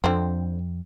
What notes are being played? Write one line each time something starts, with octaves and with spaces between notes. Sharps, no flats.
F2 D3 C4